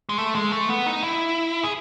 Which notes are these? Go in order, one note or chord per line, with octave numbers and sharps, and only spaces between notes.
G#3
A3
G#3
A3
B3
D#4
E4
G#4